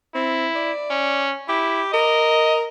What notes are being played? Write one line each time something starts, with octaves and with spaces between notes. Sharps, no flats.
C4 E4
D5
C#4
E4 G4
A#4 D#5